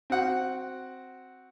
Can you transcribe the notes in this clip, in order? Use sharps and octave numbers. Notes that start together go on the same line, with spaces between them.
C4 F#4 F#5